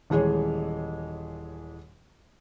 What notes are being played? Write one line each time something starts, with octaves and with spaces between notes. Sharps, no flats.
D#1 E3 G#3 G#4 C#5